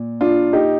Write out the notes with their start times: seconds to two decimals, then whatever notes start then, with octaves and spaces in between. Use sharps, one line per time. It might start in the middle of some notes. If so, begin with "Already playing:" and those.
Already playing: A#2
0.21 D4 F4
0.53 D#4 G4